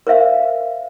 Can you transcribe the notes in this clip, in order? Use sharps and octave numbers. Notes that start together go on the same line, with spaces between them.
A#4 C5 E5 F5